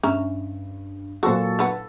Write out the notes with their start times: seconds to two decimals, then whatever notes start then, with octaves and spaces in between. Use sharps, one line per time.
0.03 G2 C#4 E5 A#5
1.23 A#2 F#3 F#4 A4 C5 C#6
1.59 D3 B4 F#5